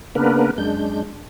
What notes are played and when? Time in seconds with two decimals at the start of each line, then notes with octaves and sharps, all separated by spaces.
0.15 C#3 A#3 B3 D4 A#4 B4
0.58 F#2 G#3 D4 G6